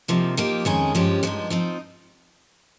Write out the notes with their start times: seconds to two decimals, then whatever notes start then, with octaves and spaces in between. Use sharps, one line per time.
0.08 C3 F3 A#3 D#4
0.37 F3 A#3 D#4 G4
0.65 F2 D#3 G#3 C#4 G#4
0.95 G2 F3 G#3 C#4 G4
1.23 G2 F3 G#3 D#4
1.50 F3 C4 D#4